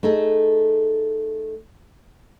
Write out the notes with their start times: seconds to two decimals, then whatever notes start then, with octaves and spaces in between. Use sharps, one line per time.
0.03 A3 D#4 G#4 A4